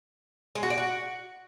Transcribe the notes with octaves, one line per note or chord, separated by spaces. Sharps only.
G#3
F#4
D5
F#4